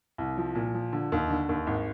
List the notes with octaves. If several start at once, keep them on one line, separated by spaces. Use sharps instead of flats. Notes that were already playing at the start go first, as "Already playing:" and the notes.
C2
F3
A#2
F3
D3
D#2
D3
D#2
G#1